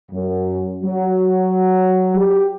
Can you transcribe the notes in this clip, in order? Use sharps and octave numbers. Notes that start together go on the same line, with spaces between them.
F#2
F#3
G4